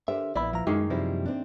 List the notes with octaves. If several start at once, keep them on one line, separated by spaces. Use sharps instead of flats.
D3 G4 A#4 C5 E5
A#1 B3 E4 D5 B5
F3 F4 A#5
F#2 D#3 G#3 A#3 G#4
C3 F3 G3 E4 C5
C4 D4